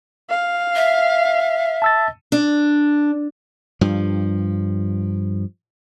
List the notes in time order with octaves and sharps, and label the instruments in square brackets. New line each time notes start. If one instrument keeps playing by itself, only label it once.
[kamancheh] F5
[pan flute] E5
[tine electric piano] A5 E6 A6
[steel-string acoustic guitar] D4
[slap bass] G2 F3